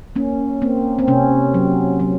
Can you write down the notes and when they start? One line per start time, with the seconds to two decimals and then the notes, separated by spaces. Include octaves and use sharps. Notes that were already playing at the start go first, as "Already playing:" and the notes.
0.16 A#3 C#4
0.62 A#3 C4
0.99 C4
1.08 C3 C#4
1.54 F#3
2.00 F#3